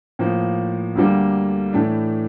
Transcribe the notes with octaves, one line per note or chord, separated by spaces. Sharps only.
A2 F3 A#3
D2 D3 G3 A#3
A2 E3 A3 D4